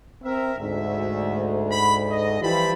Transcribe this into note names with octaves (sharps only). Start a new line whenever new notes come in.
C4 A#4 E5
D2 G#2 E5
B5
D#5
E3 F3 G3 C4 A5 B5